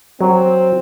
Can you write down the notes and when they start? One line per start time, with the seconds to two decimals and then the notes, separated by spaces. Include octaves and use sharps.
0.21 F#3 C4